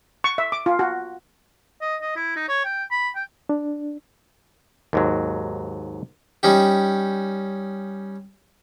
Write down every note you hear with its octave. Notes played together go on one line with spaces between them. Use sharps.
C#6
E5
D6
F4
F#4
D#5
D#5
E4
D#4
C#5
G5
B5
G5
D4
D#2 G#2 F#3
G3 C#4 D#4 G4